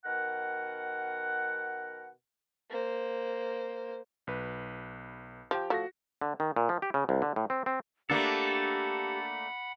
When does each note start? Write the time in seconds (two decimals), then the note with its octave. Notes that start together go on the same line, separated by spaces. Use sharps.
0.05 B2 D#3 A#4 F#5
2.70 A#3 C5
4.27 B1 B4
5.51 F3 G4 G5
5.70 F3 A3 F#4 A#6
6.21 D3
6.40 D#3
6.56 A#2
6.69 F3
6.82 G4
6.94 C#3
7.09 C2
7.22 D3
7.36 A2
7.50 C4
7.66 C4
8.10 A3 A#3 D4 G4 A4 F#5 B5